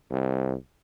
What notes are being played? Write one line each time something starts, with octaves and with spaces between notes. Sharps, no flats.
C2